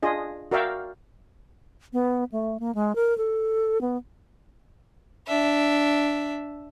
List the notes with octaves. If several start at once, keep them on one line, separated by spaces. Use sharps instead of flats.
D4 F4 G#4 D#5
F#4 A#4 D5 E5 F5 G5
B3
A3
A#3
G#3
A#4
A4
B3
D4 E5